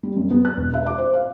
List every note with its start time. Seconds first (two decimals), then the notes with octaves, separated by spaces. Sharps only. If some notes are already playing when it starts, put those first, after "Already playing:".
0.03 G3
0.17 F#2
0.30 B3
0.45 F#6
0.57 E1
0.74 E5
0.86 D6
0.98 C5
1.13 F5